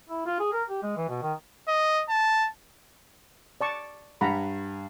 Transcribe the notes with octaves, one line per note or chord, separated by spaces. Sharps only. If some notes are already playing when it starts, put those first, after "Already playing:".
E4
F4
G#4
A#4
G4
G#3
E3
B2
D#3
D#5
A5
D5 A5 C#6
G2 F#5 A#5 B5